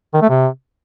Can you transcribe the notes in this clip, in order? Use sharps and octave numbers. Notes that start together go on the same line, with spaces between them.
D#3
A3
C3